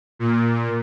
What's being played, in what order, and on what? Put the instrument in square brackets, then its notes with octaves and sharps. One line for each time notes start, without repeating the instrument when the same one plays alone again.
[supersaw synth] A#2